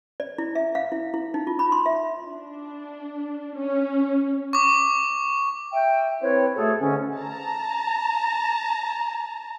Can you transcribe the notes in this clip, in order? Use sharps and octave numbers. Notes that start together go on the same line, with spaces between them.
D5
E4
E5
F5
E4
E4
D#4
F4
B5
C6
E5
D4
C#4
C#6 D6
E5 G5
C4 E4 B4 C#5
B2 A3 G#4 A4
G#2 D3 C#4
A5 A#5